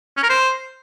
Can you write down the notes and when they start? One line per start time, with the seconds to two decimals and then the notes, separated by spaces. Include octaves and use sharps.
0.17 C#4
0.23 A#4
0.29 C5